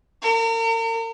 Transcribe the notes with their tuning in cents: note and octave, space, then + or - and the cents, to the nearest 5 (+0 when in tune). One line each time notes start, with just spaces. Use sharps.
A#4 -40